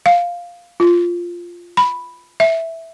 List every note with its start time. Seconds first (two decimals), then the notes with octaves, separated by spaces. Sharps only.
0.06 F5
0.80 F4
1.77 B5
2.40 E5